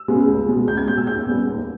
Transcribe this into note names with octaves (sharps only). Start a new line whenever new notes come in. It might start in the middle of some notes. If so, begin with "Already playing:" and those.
Already playing: E6
C#3 G#3 B3
C#2
B2 G#3
C#2 G6
G#6
B2 G#3 G6
E6
D#2 G6
C#3 G3 B3
D#2